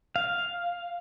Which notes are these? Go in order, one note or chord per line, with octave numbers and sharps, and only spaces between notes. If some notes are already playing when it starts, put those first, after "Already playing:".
F5